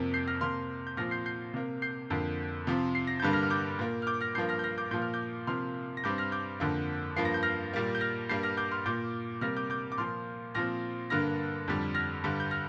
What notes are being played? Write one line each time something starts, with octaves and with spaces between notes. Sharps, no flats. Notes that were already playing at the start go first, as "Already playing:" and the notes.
Already playing: F2 C3 A#3
G6 C7
F6 A#6
C3 A#3 C6 F6
G6
A#2 F3 C4 F6 A#6
G6 C7
G6 C7
C3 A#3
G6 C7
F2 D3 A#3
C3 F3 C4
C7
A#6
G2 D3 G3 A#3 G6
F6 A#6
F6
D6 G6
A#2 A#3
F6
D6 G6
F6 A#6
G2 F3 A#3 G6 C7
F6 A#6
G6
F6 A#6
D6 G6
A#2 F3 A#3 G6
F6
D6 G6
C3 F3 A#3 C6 F6
A#6
G2 G3 C4 D6 G6
F6 A#6
D6 G6
F2 D3 A#3
G2 F3 A#3 C7
A#6
G6
F6 A#6
A#2 G3 A#3
G6
F6 A#6
G2 G3 A#3 G6 C7
F6 A#6
D6 G6
C6 F6
A#2 A#3 D6 G6
C3 G3 A#3 F6 A#6
D6 G6
D6 G6
D6
A#2 F3 A#3 C6 F6
A#2 F3 C4 F6 A#6
G2 D3 A#3 F6 A#6
F2 D3 G3
F6 A#6
G2 D3 G3
G6
F6 A#6